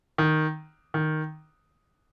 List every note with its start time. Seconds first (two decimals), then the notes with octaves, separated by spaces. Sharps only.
0.18 D#3
0.94 D#3